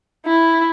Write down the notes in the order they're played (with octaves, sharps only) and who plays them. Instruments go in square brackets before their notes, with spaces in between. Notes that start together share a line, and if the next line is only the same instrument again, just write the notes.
[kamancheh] E4